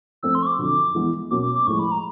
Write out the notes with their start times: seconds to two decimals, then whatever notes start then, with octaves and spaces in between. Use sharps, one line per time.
0.23 F3 A3 C4 E6
0.35 C6
0.43 C#6
0.47 D6
0.58 F2 D3 F#3
0.95 E3 G#3 B3
1.31 B2 F#3 A#3 C#4 F#4 D6
1.43 D6
1.55 D6
1.67 A2 F3 G#3 C#6
1.79 B5
1.91 A#5